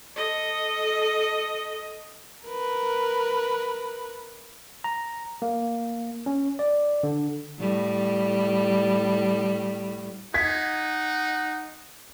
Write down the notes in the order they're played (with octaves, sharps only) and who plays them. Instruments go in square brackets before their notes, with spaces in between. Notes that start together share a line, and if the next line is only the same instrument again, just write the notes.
[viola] A4 D#5
[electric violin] A#4 B4
[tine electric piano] A#5
A#3
C#4
D5
D3
[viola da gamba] A2 G3
[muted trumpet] D#4 [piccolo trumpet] F#5 [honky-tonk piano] G#6 B6